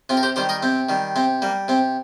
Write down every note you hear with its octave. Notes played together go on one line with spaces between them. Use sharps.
C3 C4 F4
A#4
G4 C5
D#3 G3 G4 C5
A#4 D#5
C3 C4
D#3 G3
C3 C4
G3 A#3
C3 C4